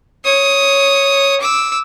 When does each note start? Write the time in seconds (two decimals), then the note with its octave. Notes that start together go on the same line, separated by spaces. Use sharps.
0.24 C#5 D#6
1.41 D6 E6